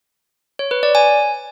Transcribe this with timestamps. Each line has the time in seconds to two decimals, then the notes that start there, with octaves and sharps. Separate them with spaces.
0.59 C#5
0.71 B4
0.83 D5
0.95 G#5